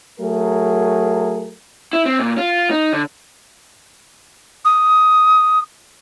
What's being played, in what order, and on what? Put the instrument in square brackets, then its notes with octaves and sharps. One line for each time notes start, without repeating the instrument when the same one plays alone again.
[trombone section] F#3 A3 G#4 A#4
[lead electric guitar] E4
C4
A#2
F4
D#4
D3
[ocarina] D#6